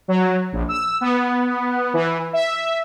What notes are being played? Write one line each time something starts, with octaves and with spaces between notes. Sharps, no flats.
F#3
A#1
E6
B3
E3
E5